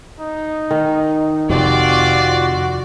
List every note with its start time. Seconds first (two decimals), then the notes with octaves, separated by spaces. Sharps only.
0.20 D#4
0.71 D#3
1.50 F2 C3 C4 F4 F#4 D5